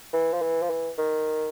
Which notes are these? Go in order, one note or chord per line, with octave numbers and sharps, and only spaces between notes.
E3
F3
E3
F3
E3
D#3